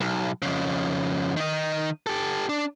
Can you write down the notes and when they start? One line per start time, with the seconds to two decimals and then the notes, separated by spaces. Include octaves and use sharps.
0.01 B1
0.42 F2 C#3
1.37 D#3 D#4
2.07 G4 A4
2.49 D4